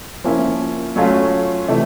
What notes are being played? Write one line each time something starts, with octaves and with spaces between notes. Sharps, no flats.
F3 A#3 C#4 E4
F#3 A3 C#4 F4
C3 E3 A3